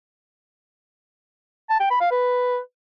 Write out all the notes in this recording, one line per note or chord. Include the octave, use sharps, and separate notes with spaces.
A5
G5
B5
F5
B4